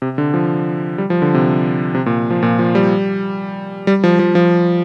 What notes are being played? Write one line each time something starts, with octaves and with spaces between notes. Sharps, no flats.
C3
D3
F3
G3
F3
D3
C3
C3
A#2
F3
A#2
F3
G3
G3
F3
F3
F3